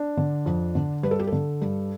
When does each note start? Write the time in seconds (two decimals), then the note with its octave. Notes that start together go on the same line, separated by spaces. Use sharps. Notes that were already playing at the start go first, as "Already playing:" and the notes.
Already playing: D4
0.17 D3
0.46 F2
0.75 D3
1.03 G2 B4
1.11 A4
1.19 G4
1.27 D3 A4
1.61 G2